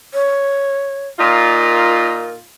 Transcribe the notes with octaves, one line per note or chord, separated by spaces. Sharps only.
C#5
A#2 D#4 F4 A#4